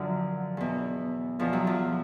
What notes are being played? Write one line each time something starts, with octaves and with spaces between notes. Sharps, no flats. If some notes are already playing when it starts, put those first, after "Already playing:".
Already playing: F#2 D3 F3 F#3
E2 B2
E2 B2 F3
F#3
F3